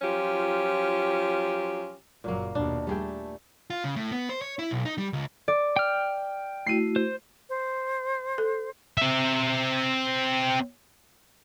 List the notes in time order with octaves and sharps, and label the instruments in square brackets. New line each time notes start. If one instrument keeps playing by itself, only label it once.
[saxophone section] F3 F#3 C#4 F4 G4
[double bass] F#1 F#3 [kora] A#2 A#3
[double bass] D#2 B2 [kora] D4
[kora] G3 G#4 G5 [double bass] A3
[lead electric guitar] F4
C#3
A2
B3
C5
C#5
E4
B1
D#4
G3
C#2
[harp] D5
[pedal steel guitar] G5 F6
[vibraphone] A3 E4 F#4 [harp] C7 D#7
[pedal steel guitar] C5
[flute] C5
[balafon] A4
[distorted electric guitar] C4 E5